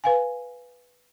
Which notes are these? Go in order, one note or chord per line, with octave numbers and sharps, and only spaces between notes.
B4 F5 G#5